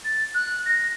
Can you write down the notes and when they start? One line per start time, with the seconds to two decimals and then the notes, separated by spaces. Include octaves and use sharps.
0.05 A6
0.35 F#6
0.66 A#6